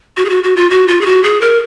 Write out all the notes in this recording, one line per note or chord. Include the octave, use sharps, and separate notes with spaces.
F#4
G#4
F#4
F#4
F4
F#4
F4
G#4
F#4
G#4
A#4